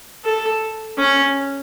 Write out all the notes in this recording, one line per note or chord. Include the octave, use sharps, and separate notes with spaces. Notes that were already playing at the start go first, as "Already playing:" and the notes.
A4
C#4